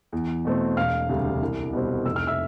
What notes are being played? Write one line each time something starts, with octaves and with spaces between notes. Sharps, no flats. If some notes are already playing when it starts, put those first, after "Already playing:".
E2
B2 A3 C4
E1 F5 F6
D2 C3 G3
C2
B2 G3 C4
F1 E6
F6
E5 E6